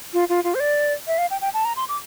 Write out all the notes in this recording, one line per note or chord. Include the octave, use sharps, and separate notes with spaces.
F4
F4
F4
C5
D5
E5
F5
G5
G5
A5
A#5
C6
D6